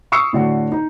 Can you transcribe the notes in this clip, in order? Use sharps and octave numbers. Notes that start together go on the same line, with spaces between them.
B5 C#6 D#6 E6 C7 C#7
A2 D3 F#4
D#4